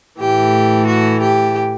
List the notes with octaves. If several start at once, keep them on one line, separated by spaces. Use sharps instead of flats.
A2 E3 A3 G4
F#4
G4